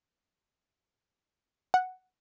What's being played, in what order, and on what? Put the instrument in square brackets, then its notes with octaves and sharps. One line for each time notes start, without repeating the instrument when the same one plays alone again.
[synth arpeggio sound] F#5